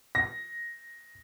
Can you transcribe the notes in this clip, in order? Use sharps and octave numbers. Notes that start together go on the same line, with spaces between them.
A#6